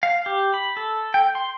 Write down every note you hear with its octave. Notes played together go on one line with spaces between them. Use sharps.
F5
G4
B5
A4
G5
C6